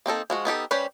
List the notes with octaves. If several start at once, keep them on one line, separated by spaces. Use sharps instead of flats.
A#3 C4 D#4 A4
F3 G#3 F#4
B3 D#4 G4 A4
G3 C#4 G4 B4 C5